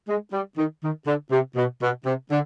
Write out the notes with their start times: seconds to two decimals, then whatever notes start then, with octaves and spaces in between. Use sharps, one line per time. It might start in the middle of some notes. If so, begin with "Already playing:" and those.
0.08 G#3
0.32 G3
0.57 D#3
0.83 D#3
1.06 D3
1.31 C3
1.56 B2
1.81 B2
2.05 C3
2.31 D3